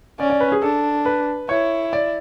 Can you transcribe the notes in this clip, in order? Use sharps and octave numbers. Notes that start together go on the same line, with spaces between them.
C#4 D5
D5
B4
G#4
D4 A4
B4
E4 C#5
D5